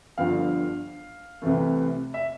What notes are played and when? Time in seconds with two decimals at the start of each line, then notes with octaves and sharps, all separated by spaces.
0.18 G1 G2 D3 F3 F5
1.42 C2 C3 E3 A3
2.14 E5